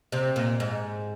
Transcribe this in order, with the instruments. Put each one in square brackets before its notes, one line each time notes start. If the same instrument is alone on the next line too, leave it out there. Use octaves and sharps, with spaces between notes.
[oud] C3
A#2
G#2